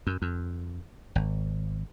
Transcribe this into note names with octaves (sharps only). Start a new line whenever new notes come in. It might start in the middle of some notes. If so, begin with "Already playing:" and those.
F#2
F2
G#1